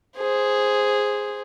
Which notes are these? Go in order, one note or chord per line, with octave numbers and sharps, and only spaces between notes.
G#4 C5